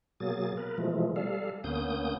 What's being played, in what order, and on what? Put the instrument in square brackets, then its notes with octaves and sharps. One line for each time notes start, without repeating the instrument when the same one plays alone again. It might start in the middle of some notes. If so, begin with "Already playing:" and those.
[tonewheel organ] B2 F#3 A#3 G#4 A6
A#4 B4
B2 E3 F3 G#3 A3
G3 A4 F5
D2 A#3 B3 C#4 D#6 G6